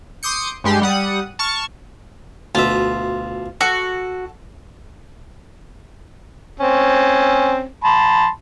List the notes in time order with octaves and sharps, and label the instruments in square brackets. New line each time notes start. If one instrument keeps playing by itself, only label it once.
[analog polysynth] C6 D6 D#6 G6 C#7
G2 G#3 G4 C6
G3 F#5 D#6
A5 C#6 F6
[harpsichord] D2 B2 E5 [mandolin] F4
[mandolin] F#4 [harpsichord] A4
[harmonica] C4 C#4
A5 B5 C6